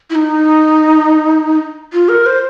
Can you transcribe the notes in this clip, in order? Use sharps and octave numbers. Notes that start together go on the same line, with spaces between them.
E4
D#4
F4
A#4
C5